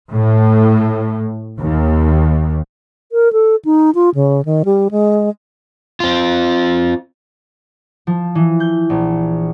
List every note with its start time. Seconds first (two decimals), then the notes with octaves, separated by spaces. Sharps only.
0.11 A2
1.58 D#2
3.12 A#4
3.33 A4
3.65 D#4
3.95 F4
4.15 C#3
4.45 D#3
4.65 G3
4.91 G#3
6.00 C4 F4
8.07 F3
8.35 E3
8.60 G6
8.90 A#1